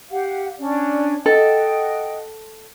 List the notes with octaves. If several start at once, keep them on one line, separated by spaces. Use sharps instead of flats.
G4 F5 F#5
C#4 D4 D5
A4 D#5 F#5 G5